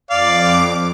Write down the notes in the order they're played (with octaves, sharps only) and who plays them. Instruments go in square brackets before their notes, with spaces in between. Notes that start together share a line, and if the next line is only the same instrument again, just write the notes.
[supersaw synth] F2 D6 [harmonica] D5 F5